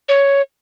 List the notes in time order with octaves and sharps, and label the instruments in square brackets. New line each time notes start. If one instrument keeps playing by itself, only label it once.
[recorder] C#5